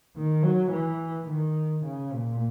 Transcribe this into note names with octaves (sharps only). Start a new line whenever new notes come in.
D#3
F#3
E3
D#3
C#3
A#2